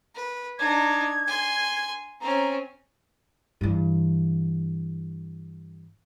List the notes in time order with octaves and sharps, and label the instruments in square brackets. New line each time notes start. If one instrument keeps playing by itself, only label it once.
[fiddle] B4
[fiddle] D4 D#4 [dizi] G#6
[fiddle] G#5 C6
[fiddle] C4 C#4 [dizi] A#5
[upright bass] G2 E3